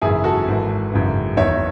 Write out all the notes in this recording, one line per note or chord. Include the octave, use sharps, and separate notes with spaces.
G#1 F#2 C#3 E3 E4 G#4
F#4 A4
G#1 G#2 E3
G#1 F#2 C#3 E3
F#1 E2 D#3 C#5 E5